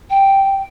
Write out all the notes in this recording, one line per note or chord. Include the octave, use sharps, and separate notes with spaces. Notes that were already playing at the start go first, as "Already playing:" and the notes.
G5